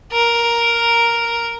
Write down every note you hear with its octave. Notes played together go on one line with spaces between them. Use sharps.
A#4